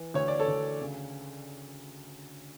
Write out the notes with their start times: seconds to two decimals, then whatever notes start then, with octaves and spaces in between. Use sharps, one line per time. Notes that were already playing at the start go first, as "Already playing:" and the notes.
Already playing: E3
0.14 D2 C#5
0.28 D5
0.39 A4 C#5
0.48 D2
0.81 C#3